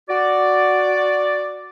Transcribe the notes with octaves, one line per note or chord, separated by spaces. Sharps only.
F#4 D5